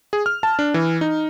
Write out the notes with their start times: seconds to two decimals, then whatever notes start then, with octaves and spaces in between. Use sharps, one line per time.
0.13 G#4
0.26 F6
0.43 A5
0.59 D4
0.74 E3
1.01 D#4